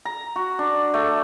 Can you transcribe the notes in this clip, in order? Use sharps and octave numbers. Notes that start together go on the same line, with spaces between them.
A#5
F#4
D4
A3